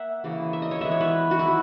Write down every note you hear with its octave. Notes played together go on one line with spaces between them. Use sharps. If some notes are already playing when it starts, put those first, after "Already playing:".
Already playing: A#3 E5 F#5
C#3 E3 A#3
E5
D#5
C#5
E3 G#3 B3 E5
C#5
B4
F#4
D#3 F#3 B3 E4